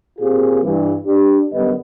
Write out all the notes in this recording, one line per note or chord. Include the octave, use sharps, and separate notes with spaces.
A#2 C4 F4 G4 G#4
G2 E3
D4 G4
F#2 D3 G3 B3 B4 D#5